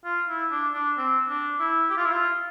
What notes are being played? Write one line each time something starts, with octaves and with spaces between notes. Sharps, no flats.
F4
E4
D4
D4
C4
D4
E4
G4
F4
E4
F4